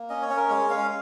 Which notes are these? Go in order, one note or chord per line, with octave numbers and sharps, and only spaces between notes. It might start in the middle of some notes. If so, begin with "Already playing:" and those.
Already playing: A#3
C#4 D#5
C#5
C#4
A#4
G#3 C#5
C#4 F5